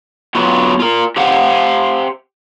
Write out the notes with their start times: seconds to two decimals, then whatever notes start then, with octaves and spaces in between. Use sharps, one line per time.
0.35 F#3 B3 F4
0.80 F4 A#4
1.16 G4 C5 F5 F#5